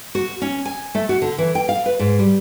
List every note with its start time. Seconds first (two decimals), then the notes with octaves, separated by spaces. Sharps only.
0.15 F#4
0.42 C#4
0.65 G#5
0.95 A3
1.09 F#4
1.22 D3
1.38 E3
1.55 G5
1.69 F5
1.86 B4
1.99 G#2
2.19 G3